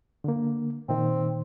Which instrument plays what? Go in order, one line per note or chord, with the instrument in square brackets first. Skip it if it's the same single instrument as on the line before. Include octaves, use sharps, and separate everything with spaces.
[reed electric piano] D3 A#3
[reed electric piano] A#2 D#3 [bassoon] C4